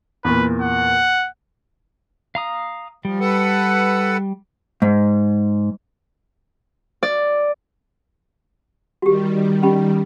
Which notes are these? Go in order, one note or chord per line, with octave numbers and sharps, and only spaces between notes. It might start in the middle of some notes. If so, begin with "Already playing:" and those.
E2 A#2 B4
F#5
F5 A#5 D#6
F3 G3
A4 B4 F#5
G#2
D5
D#3 G3 F#4 G4
C#4 G4 B5